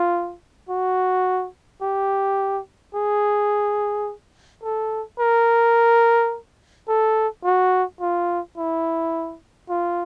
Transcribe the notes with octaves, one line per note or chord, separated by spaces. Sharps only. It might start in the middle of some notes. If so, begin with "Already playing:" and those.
Already playing: F4
F#4
G4
G#4
A4
A#4
A4
F#4
F4
E4
F4